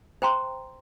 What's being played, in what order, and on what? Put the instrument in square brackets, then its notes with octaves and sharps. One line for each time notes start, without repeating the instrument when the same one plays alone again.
[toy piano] C5 G5 A#5 C6